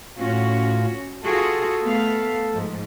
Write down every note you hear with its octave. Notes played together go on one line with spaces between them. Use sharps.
A2 C#4 F4 F#4
F4 F#4 G#4 A4
A3 B3 F5
G#2 F3